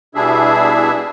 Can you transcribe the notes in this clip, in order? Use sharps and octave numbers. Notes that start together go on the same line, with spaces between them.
B2 G3 D4 E4 G#4 E5